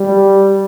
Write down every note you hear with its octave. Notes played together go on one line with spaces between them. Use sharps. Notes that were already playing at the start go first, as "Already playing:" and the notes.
Already playing: G3